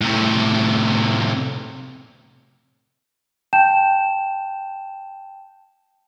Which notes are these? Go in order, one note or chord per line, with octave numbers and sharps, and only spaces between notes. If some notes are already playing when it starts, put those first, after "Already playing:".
A2 C3
G5 A5 G6 E7